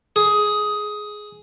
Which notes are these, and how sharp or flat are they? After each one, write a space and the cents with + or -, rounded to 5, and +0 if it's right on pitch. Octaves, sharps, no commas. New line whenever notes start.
G#4 +10